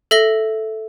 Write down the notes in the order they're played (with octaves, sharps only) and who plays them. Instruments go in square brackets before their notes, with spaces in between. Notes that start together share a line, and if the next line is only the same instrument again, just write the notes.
[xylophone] A4 E5 A#6 G7